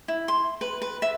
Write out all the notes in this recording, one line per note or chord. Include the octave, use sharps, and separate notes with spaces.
E4
C6
B4
B4
E5